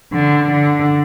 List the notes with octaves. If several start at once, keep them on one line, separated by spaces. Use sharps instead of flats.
D3
D3